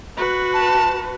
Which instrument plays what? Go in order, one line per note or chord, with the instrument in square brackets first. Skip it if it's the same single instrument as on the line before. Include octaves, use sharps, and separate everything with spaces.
[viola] F#4 B4
[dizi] A5